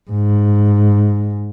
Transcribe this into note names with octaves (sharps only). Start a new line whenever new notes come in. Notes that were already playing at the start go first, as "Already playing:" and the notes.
G#2